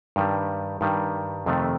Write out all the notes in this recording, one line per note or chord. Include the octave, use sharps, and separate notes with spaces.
G2 D#3 G3
G2 D#3 G3
F2 C3 D#3 A3